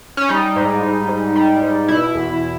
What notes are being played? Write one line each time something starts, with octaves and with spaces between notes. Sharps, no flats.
C#4
G3 D#4
G#2
G#2
G#2
G3
G#2
B2 E4
E2